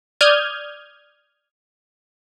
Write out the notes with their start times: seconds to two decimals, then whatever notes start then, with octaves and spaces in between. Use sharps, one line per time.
0.21 D5 D#6 F6 G6 G#6